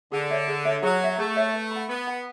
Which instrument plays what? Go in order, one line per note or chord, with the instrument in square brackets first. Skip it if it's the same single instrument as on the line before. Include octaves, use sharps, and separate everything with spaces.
[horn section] D3 [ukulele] G#4
[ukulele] C#5 E5
G#4
C#5 E5
[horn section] F#3 [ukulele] G#4
[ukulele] C#5 E5
[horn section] A3 [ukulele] G#4
[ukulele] C#5 E5
B4
F#5 B5
[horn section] B3 [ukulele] B4
[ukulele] F#5 B5